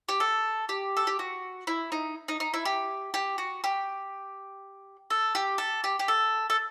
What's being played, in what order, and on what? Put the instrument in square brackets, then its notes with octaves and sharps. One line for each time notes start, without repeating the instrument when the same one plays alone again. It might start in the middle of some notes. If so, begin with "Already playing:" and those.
[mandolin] G4
A4
G4
A4
G4
F#4
E4
D#4
D#4
D#4
E4
G4
G4
F#4
G4
A4
G4
A4
G4
G4
A4
A4